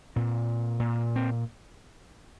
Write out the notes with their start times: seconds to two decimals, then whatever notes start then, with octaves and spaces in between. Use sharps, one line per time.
0.16 A#2 C4
0.79 A#2
1.16 C4